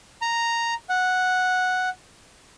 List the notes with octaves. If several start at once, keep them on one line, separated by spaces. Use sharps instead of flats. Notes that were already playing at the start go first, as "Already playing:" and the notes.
A#5
F#5